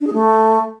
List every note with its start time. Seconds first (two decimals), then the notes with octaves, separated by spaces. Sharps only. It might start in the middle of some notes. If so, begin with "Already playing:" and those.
0.01 D4
0.07 G#4
0.13 A3